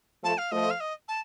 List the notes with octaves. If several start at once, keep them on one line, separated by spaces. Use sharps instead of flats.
F3 A3 A5
F5
F3 A3 D#5
F5
D#5
A5